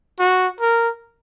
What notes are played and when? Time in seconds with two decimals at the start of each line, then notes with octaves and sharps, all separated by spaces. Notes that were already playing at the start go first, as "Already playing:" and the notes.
0.19 F#4
0.61 A#4